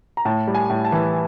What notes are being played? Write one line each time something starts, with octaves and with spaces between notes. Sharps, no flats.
A#5
A2 A5
G3
G#5
A2
A5
E3